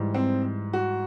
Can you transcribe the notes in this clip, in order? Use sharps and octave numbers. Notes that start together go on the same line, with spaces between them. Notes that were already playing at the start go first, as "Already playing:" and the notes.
Already playing: G#2 E3 G3
C4
F#4